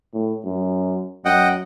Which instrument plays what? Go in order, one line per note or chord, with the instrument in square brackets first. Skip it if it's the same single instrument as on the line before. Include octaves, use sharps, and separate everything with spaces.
[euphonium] A2
F#2
[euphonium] F#2 [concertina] D#5 F#5 G5